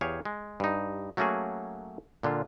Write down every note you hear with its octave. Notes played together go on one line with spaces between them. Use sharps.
E2 G4 G#4 C#5 F5
G#3
G2 D#4
F#3 A3 A#3 C#4 F#4 G#4
A#2 D3 D4 F4